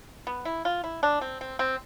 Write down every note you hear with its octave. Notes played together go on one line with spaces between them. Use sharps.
B3
E4
F4
E4
D4
C4
C4
C4